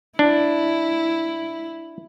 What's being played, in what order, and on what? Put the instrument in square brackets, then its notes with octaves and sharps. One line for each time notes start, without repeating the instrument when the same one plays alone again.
[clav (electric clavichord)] D4 [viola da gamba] E4